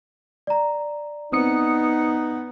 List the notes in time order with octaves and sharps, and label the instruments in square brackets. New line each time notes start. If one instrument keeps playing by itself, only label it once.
[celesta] D5 A#5
[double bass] B3 [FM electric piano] C4 D#6 C#7 [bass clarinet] D#4